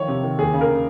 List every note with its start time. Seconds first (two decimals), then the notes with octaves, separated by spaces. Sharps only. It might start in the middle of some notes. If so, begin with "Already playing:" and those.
Already playing: D#3 F3 C#5
0.08 C3
0.23 D#3
0.39 D#2 G#4
0.53 C#3
0.61 A#4
0.68 C#3